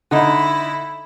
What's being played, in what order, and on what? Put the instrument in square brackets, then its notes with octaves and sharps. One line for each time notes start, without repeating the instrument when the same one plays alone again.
[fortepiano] D3 D#4 [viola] E4